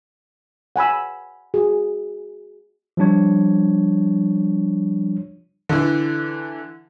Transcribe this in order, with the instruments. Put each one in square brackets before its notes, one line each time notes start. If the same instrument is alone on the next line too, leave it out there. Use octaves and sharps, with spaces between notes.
[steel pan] F#5 G#5 B5 E6
F#4 G#4
[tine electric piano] F3 G3 D4 C#5
[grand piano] D3 E3